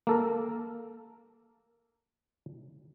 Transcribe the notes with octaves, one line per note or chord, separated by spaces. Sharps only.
A#3 A4 A#4